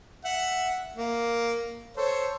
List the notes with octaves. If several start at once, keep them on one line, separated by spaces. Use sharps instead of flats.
E5 F#5
A#3
A4 C5 C#5